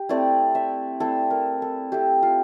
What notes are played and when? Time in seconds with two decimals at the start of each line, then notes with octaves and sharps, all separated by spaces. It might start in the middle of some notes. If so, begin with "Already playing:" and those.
Already playing: G4
0.09 A3 C4 E4 D5
0.55 E5
1.00 A3 C4 E4 A4
1.30 A#4
1.62 A4
1.92 A3 C4 E4 G4
2.23 F4